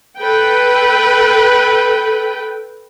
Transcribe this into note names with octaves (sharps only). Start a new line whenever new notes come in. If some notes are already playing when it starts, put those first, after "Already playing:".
A4 B4 G5